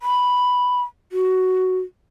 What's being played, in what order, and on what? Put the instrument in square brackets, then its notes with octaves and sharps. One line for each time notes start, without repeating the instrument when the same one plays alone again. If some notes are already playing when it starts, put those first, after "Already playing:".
[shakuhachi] B5
F#4